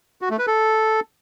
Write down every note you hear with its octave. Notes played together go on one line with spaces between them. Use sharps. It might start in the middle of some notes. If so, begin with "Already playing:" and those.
F#4
A3
B4
A4